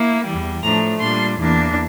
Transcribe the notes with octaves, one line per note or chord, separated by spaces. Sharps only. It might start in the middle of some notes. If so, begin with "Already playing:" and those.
Already playing: A#3 E4
E2 E3 G3
A2 F3 A3 D4 A#5
A#2 G3 D4 C6
E2 E3 A#3 D4